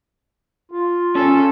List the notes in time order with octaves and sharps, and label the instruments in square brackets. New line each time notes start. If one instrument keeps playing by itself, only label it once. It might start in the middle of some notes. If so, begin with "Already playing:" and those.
[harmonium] F4
[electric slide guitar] C#4 G#4 [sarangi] A4